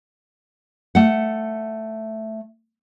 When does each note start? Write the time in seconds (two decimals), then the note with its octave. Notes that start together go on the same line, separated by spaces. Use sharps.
0.95 A3 F#5